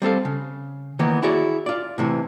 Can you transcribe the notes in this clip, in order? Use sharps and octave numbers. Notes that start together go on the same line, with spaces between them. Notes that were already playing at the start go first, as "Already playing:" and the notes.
G3 C4 A4 F5
C#3
D#3 E3 A#3 B3
E4 F#4 G#4 C#5 D5
F4 D5
A2 C3 E3